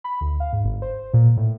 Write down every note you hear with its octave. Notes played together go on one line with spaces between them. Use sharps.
B5
D2
F5
G#2
G1
C5
A#2
A2